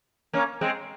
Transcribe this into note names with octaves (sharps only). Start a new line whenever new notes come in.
A#3 C#4
G#3 C4